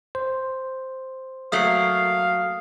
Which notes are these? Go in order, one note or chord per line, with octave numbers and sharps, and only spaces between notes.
C5
F#3 A3 A#3 F5 D#6 C7